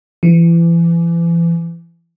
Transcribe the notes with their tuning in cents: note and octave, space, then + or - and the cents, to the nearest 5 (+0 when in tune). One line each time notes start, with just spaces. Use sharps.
E3 +35